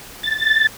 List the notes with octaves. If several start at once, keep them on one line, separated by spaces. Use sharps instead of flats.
A6